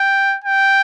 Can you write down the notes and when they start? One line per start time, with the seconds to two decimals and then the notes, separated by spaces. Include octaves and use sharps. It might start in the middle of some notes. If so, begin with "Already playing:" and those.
Already playing: G5
0.44 G5